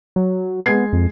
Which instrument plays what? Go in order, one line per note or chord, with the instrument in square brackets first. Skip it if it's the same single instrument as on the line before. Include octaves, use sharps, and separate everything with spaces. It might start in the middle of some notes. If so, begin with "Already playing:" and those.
[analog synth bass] F#3
[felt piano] G#3 G#6 C7 [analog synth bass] B3
[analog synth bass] F2